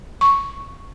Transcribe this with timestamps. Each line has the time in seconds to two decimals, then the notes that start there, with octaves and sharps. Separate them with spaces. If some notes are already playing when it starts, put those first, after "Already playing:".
0.21 C#6